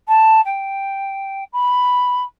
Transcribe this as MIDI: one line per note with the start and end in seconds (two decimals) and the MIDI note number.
0.08 0.41 81
0.45 1.44 79
1.53 2.22 83